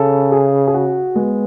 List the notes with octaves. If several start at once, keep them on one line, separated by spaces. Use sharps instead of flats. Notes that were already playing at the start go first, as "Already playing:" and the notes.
Already playing: C#3 A4
G#4
G#4
F#4
G#3 B3